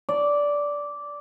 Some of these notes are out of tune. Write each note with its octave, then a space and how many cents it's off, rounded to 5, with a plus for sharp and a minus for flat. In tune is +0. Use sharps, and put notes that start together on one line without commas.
D5 -10